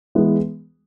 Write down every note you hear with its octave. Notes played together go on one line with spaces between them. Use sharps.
E3 G#3 B3